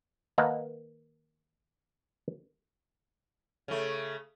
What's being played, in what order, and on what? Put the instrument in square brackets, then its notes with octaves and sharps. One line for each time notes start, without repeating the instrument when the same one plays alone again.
[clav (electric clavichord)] D#3 A#3 D#4 B4 F#5 A5
[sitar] C#3 A3